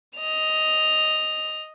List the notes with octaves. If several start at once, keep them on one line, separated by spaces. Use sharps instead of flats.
D#5 F7